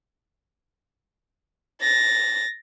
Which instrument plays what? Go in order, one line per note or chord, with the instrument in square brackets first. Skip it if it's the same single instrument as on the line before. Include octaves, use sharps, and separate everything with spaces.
[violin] A6 A#6